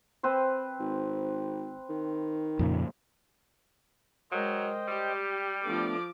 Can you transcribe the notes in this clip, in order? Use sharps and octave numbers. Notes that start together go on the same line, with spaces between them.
C4 B4 C5
G#1
D#3
F2 A#2 C#3
F#3 G#3 A#4 C5 D#5 G5
G3 G4
F3 A3 B3 D4 D6